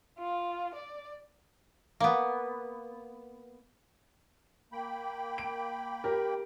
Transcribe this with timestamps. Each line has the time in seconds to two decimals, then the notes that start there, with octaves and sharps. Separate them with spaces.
0.19 F4
0.74 D5
2.00 A#3 B3
4.72 A#3 G5 B5
5.38 D7
6.04 G4 A#4